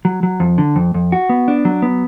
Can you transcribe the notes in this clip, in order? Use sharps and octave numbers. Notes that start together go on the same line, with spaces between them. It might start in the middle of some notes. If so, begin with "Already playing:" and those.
F#3
F#3
F2
D3
F2
F2
F#4
B3
D4
F#3
B3